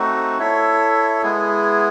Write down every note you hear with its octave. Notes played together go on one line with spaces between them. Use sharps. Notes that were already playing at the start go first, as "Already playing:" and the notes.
Already playing: A3 C4 D#4 F#4
E4 A4 C#5 E5
G#3 B3 E4 G#4